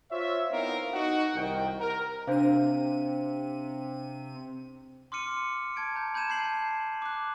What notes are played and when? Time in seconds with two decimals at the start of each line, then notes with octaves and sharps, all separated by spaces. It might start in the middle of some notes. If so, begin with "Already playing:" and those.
0.11 F4 C5 C#5 E5
0.50 B3 C4 D#4 E4 A#4 F5
0.93 D#4 F#4
1.35 C2 D#3 G5
1.79 A#4
2.27 C3 D4 C5 F5 D#7
5.12 C6 D6 F6 C#7 D#7
5.76 A5 G#6 D7
5.96 A#5 G6
6.14 B5 G6 G#6 D#7 E7
6.29 A5 G6 C7 F#7
7.02 D6 F#6